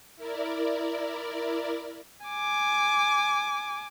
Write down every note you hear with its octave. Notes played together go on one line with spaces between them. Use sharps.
E4 A#4 D5
G#5 D6